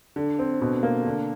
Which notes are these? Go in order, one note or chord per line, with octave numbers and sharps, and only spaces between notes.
D3
C4
B2
A#3
D3